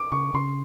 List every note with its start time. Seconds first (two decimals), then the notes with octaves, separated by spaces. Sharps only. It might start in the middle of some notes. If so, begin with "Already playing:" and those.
Already playing: D6
0.12 C#3 C#6
0.34 C#3 C6